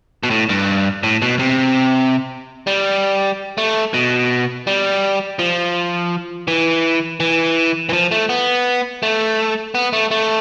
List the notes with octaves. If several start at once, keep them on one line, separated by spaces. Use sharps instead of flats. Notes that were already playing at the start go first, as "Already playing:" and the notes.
B2
A2
G2
A2
B2
C3
G3
A3
B2
G3
F3
E3
E3
E3
F3
A3
B3
A3
B3
A3
A3